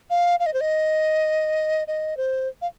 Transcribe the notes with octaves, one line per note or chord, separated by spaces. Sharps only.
F5
F5
D#5
C5
D#5
D#5
C5
F5